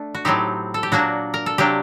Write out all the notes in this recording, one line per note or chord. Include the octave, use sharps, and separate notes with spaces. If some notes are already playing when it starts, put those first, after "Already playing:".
Already playing: A3 D4
F#4
A2 F#3 C4 D#4 G4
A4
G4
A#2 F#3 A#3 D4 F#4
A#4
A4
C3 F#3 A#3 D4 G4